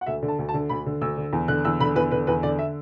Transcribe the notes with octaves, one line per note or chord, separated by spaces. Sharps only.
F#5
D2 E5
D3
A5
D2
A5
D3
D2 B5
D3
D2 E6
D3
E2
D3 F#6
E2 E6
D3 B5
E2 B4
D3 B4
E2 B4
D3 D5
E5